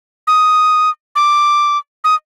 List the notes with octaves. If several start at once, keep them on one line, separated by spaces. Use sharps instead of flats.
D#6
D6
D#6